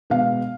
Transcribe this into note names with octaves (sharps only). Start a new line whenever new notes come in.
B2 G#3 B3 F5